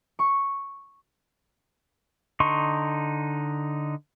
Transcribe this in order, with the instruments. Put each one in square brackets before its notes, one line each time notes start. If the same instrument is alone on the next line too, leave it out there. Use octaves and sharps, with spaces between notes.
[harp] C#6
[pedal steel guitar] D3 D#4 C6 C#6